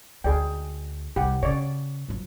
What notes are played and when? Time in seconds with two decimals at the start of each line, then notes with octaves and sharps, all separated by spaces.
0.24 D2 G#4 D5 G5
1.16 C2 G4 F#5
1.43 C#3 C#5 D5
2.08 F2 F#3